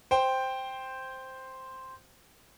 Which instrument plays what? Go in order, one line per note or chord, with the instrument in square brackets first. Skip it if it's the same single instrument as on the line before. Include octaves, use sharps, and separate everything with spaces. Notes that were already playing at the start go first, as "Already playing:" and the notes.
[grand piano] C5 G5